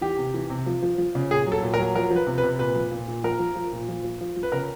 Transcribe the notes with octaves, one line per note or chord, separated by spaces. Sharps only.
E3 G4
C3
E3
C3
F3
F3
F3
C#3
A#2 G#4
F#3
A4
A#2
A#4
F#3
F3 A#4
F3
B4
C3
B4
C3
A#2 B4
F3
A#2
A#2
F3 A#4
F3
F3
A#2
F3
F3
F3
F3
B4
C#3 A#4